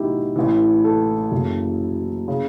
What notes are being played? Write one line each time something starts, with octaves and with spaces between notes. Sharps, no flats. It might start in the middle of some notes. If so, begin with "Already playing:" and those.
Already playing: B1 A2 E3 D#4 E4 F#4 G4
A1 A2 E3
A4
F#1 F#2 C#3 E3
C#3